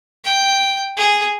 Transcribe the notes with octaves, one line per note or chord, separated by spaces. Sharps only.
G5
G#4